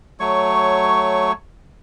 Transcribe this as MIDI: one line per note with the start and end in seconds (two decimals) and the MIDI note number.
0.20 1.32 54
0.20 1.32 57
0.20 1.32 73
0.20 1.32 85